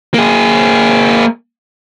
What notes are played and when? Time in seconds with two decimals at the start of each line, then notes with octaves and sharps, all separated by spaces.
0.14 A#3 G#4